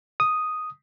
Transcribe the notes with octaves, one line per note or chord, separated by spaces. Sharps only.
D#6